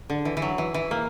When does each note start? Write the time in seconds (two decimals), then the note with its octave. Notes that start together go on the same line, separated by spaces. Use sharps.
0.10 D3
0.25 E3
0.37 E3
0.42 F#3
0.58 E3
0.74 E3
0.91 A#3